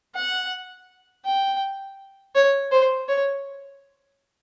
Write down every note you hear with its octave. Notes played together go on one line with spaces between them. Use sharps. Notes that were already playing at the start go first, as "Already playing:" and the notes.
F#5
G5
C#5
C5
C#5